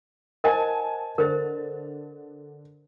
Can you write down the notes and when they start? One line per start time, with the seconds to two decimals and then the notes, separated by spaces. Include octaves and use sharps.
0.44 A#4 C5 D#5 F#5 G#5 A5
1.18 D3 A#4 C5 A6